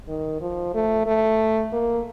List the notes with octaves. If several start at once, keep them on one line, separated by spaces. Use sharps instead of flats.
D#3
F3
A3
A3
A#3